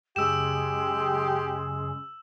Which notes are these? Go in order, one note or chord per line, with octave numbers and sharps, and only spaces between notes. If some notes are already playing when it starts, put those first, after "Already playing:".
F#2 C#3 G#3 G4 E6 E7